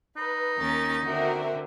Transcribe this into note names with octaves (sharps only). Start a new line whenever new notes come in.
D#4 B4
D#2 C#4 A#4 A6
D3 C4 F#4 A#4 E5